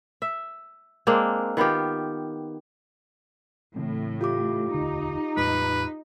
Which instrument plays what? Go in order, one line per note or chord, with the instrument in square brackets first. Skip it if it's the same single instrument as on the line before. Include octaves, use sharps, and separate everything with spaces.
[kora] E5
G#3 A#3 C4 D4
D#3 B3 F4 G4
[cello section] A2 [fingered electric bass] C#3 E3 C4
[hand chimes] F4 G4 D6
[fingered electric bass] E1 D2 D3 [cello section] D#4
[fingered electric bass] E2 A2 G#3 [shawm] B4